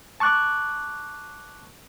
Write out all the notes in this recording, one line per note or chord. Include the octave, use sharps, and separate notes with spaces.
A5 C#6 D6 F#6